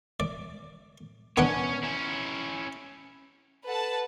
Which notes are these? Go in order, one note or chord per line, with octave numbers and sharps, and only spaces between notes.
D5
B3 C#4 D4 C#5 F#5
C#4 E4
A4 B4 F#5 A5